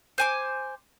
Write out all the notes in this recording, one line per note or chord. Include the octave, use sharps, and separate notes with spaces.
C5 G#5 D6